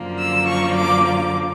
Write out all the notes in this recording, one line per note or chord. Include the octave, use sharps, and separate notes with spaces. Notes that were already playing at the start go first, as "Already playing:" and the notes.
Already playing: F#2 D3 F3 A#3
E6
C#6
D6
D6